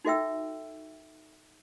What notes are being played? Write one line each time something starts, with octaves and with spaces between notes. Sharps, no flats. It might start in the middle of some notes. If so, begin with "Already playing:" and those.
D#4 F#4 A4 E5 G5 E6